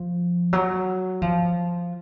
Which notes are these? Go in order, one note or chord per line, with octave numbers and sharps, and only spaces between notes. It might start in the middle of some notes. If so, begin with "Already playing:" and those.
Already playing: F3
F#3
F3